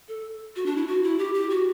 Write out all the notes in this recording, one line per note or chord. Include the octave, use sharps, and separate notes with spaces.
A4
F#4
D4
E4
F#4
E4
G4
G4
F#4